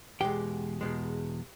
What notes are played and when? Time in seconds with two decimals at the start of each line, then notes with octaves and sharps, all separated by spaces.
0.20 E2 B2 G#3 G4 G5
0.81 E2 B2 G#3